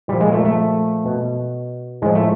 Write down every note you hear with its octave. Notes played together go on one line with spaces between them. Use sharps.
A#2 F3 G3
G#3
A#3
A3
A3
B2
A2 F3 G#3
A3